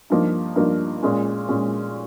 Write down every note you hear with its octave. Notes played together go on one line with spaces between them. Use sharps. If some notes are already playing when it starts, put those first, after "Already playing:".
G2 F3 A#3 D#4
G2 F3 A#3 D#4
A#2 G#3 C#4
A#2 G#3 C#4